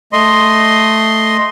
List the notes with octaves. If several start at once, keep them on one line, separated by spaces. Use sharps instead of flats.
A3 D#5 C6